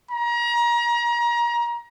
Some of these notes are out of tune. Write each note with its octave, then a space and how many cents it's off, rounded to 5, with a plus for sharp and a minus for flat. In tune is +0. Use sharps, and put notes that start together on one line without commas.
A#5 +30